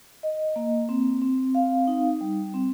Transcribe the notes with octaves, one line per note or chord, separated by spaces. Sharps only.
D#5
A#3
C4
C4
F5
D#4
G3
C4